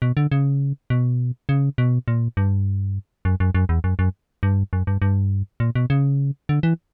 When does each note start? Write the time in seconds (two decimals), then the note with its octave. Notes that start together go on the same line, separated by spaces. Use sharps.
0.02 B2
0.17 D3
0.32 C#3
0.90 B2
1.49 C#3
1.78 B2
2.08 A#2
2.37 G2
3.25 F#2
3.40 F#2
3.55 F#2
3.69 E2
3.84 F#2
3.99 F#2
4.43 G2
4.73 F#2
4.87 G2
5.02 G2
5.60 A#2
5.75 B2
5.90 C#3
6.49 D3
6.63 E3